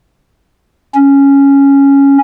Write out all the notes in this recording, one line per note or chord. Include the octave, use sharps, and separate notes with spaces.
C#4